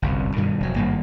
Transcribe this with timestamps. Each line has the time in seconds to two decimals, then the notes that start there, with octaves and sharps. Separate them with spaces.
0.02 G1 C2 F#2
0.36 G2 B2 D#3
0.60 F1 F#3
0.76 G#1 G2 A#3